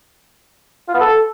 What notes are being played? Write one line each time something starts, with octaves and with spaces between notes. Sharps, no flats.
F4
B3
A4